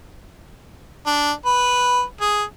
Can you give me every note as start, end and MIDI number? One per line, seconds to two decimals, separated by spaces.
1.06 1.31 62
1.46 2.02 71
2.21 2.43 68